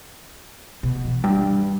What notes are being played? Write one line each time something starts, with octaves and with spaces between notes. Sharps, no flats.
B2
E3
G2